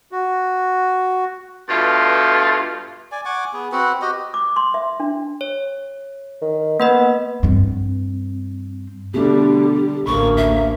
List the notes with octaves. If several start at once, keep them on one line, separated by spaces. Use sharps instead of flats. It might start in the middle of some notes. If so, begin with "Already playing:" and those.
F#4
G2 B2 A3 F4
D5 G#5
F#5 G#5 C#6 D6
B3 G#4
C4 F#4 B4 F#5
F#4 G4 D#5
D6
C6
E5
D4
C#5
D#3
A#3 B3 B4 D#5
G2 C4
B2 D3 G3 A3 D4 G4
A1 D2 A#3 B5 C#6
E5